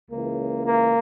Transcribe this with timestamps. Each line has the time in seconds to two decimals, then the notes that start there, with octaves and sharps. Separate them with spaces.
0.10 C#2 C#3 E3 A#3
0.65 A#3